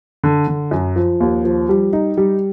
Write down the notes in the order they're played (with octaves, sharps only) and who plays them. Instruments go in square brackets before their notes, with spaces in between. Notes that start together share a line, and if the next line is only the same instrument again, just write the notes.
[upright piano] D3
D3
F#2
F3
D#2
F3
G3
D#4
G3